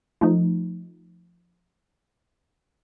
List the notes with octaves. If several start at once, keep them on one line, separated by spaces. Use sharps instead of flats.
F3 A3 D#4